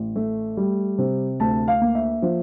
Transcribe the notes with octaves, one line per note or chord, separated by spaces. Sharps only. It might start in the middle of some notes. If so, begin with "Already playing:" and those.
Already playing: A1
A3
G3
C3
D2 A5
F5
A#3
E5
F3